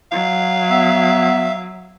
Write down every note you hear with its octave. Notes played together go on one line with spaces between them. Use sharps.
F#3 F5
B3 E5